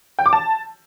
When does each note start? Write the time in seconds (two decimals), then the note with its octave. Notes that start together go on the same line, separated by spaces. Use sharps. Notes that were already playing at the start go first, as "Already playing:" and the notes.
0.19 G5
0.26 D6
0.33 A5